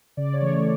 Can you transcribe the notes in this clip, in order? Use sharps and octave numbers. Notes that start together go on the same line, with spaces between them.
C#3 D5
C#5
E3 A3